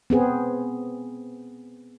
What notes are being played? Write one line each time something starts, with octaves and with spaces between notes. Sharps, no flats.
B3 C4 G#4